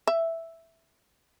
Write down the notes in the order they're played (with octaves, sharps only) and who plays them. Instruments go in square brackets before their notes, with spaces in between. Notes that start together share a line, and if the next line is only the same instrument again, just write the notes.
[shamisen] E5